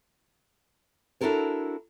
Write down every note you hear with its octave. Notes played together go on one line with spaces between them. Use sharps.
D4 E4 F#4 A4 A#4 C#5